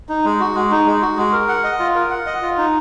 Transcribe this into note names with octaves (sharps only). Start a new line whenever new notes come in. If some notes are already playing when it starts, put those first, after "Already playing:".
D#4
G#3
F#4
G#3
D#4
G#3
F#4
G#3
A#4
F#5
D#5
F4
A#4
F#5
D#5
F4
D#4